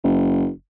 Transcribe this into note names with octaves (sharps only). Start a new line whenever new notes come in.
F#1